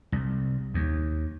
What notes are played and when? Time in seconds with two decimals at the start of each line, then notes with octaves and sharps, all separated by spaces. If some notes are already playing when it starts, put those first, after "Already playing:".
0.12 C2
0.74 D#2